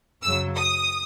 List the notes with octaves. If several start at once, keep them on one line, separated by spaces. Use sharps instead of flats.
F#2 C#3 F#3 E6
D#6